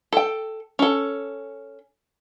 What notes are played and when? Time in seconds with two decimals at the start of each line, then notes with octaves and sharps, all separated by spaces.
0.13 A4 G5
0.79 C#4 A4